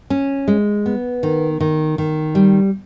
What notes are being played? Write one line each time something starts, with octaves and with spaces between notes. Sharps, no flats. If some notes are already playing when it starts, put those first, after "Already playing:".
C#4
G#3
B3
D#3
D#3
D#3
G3